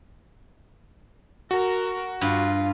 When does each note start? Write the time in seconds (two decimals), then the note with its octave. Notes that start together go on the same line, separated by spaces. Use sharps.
1.51 F#4 A#4
2.21 G2 F4